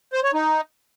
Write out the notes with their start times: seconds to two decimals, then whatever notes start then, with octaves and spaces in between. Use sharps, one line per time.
0.13 C5
0.24 C#5
0.34 D#4